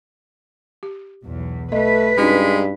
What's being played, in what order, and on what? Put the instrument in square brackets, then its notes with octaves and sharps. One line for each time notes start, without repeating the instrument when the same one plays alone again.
[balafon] G4
[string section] B1 E2
[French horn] A3 [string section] B4 [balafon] D#5 E5
[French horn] G2 [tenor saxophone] G#3 [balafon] C#4 D#4 F#4